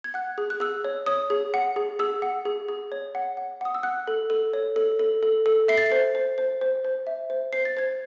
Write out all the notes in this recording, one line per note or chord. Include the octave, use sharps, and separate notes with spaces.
G#6
F#5 F#6
G#4
F#6
G#4 E6
C#5
C#5 D#6
G#4
F#5
G#4
G#4 E6
F#5
G#4
G#4
C#5
F#5
F#5
F#5 D#6
E6
F#5 F#6
A4
A4
C#5
A4
A4
A4
A4
E5 C7
A6
C7
C5
C5
C5
C5
C5
E5
C5
C5 C7
A6
C5 G#6